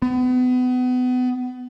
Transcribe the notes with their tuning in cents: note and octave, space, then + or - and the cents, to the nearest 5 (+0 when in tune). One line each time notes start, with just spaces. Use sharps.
B3 +30